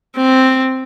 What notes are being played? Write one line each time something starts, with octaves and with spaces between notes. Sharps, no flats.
C4